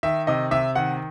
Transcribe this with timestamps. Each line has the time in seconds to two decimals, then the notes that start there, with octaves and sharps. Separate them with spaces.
0.03 D#3 E5
0.27 C3 D#5
0.51 C3 E5
0.75 D#3 F#5